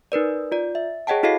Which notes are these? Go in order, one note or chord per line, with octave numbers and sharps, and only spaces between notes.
D#4 A#4 B4 D5
F4 D5
E5
G#4 C#5 D#5 F#5 G5 A5
E4 F#4 A4 D#5 F5 C7